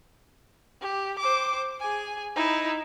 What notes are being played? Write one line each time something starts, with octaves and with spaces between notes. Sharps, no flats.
G4
C5 D6
G#4 G#5
D#4 E4